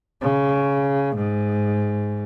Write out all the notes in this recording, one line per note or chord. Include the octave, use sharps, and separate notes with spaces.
C#3
G#2